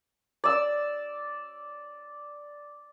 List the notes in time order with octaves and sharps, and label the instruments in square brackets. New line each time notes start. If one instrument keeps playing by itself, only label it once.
[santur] D5 E6